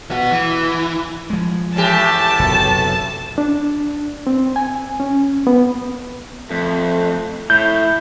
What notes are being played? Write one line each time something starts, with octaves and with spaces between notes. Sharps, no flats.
B3 F#4
E3
F3 G#3
A2 E3 G4 A5
F#1 B1 C3
D4
C4
G#5
C#4
B3
F2 A3
A2 E4 G6